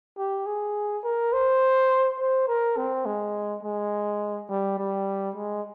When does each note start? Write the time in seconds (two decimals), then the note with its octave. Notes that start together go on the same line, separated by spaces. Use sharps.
0.18 G4
0.46 G#4
1.04 A#4
1.33 C5
2.19 C5
2.48 A#4
2.77 C4
3.06 G#3
3.63 G#3
4.50 G3
4.79 G3
5.36 G#3